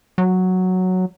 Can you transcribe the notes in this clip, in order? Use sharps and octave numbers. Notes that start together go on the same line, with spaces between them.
F#3